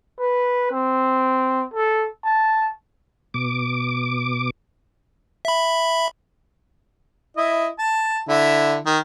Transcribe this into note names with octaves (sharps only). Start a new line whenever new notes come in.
B4
C4
A4
A5
B2 D6
E5 B5
E4 D#5
A5
D3 E4
D#3